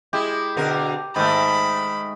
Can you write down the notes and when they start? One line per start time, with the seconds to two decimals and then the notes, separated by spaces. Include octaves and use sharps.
0.13 G#3 E4 G4
0.57 B2 D3 A#4
1.16 G#2 D#3 A3 B5